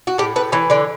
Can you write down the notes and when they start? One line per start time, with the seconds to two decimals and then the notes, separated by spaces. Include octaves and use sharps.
0.07 F#4
0.18 A2 G4
0.36 A2 B4
0.52 E3 C#5
0.70 D3 D5